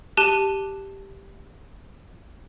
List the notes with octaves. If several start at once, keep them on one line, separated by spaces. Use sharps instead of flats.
G4 A5 F#6 D#7 G7